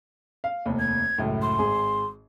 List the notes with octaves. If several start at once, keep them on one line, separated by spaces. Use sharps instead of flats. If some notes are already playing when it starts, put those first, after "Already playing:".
F5
F1 D#2
G#6
C#2 F#2 A2
C6
G#1 G#4